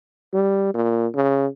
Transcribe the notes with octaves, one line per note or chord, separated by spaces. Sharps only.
G3
A#2
C#3